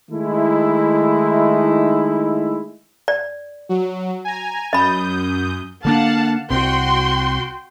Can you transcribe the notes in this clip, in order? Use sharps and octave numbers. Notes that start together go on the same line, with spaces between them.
D#3 G#3 A3 D#4 E4
D5
F#3
G#5 A#5
F#2 D#5 B5 D#6 G6
D3 A#3 D4 F5 F#5 A5
C2 C3 F#4 G5 C6